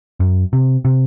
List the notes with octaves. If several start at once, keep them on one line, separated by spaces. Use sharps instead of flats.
F#2
C3
C3